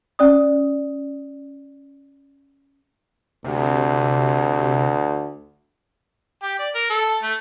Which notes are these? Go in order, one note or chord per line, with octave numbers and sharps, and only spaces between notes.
C#4 D5 D#6
D2 C3
G4
D5
A#4
A4
A3